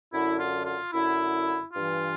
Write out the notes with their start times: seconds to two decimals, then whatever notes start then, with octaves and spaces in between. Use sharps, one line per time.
0.11 F#2 D3 E4
0.40 F4
0.66 F4
0.93 F#2 D3 E4
1.73 G2 E3 F4